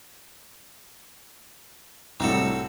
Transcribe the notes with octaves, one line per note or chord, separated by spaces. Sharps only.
C2 A2 C4 F#4 A4